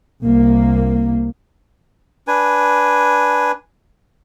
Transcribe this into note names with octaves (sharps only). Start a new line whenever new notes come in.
C2 A#3
D4 B4 G#5